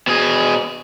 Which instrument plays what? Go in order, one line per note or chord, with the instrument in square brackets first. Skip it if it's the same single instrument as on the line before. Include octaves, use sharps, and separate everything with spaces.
[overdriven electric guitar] B2 G#4